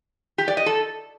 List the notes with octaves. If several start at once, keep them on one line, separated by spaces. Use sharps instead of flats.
G4
D5
D#5
A4